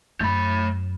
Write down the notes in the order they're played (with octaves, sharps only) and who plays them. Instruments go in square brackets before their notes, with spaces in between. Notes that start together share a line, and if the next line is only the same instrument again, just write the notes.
[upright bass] F#2 [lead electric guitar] A3 B5